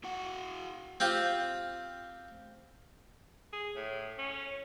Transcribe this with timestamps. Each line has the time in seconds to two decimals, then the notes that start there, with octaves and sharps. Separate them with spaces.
0.04 E4 F#4 F#5
1.00 C4 F4 G4
3.53 G#4
3.76 A2
4.18 C#4